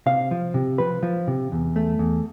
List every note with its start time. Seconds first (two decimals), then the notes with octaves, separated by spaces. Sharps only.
0.06 C3 F5
0.31 F3
0.54 C3
0.78 F3 B4
1.03 F3
1.27 C3
1.52 E2
1.76 A3
1.99 E2